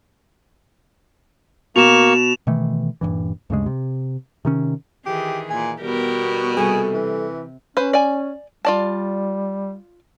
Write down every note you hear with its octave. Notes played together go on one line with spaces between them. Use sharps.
B2 A#3 C#6 E7 F7
B2 D#3 E3 A3
D#1 C2 G2 E3
D2 G2 C#3 G#3
C3
C3 D#3 C#4
D#3 E3 G4 G#4
A#2 G#5
B2 G3 B3 G4 A#4
C3 G3 G#4 A4 G#5
E3
C#4 B4 C5
D5 G#5
G3 F4 D5 A5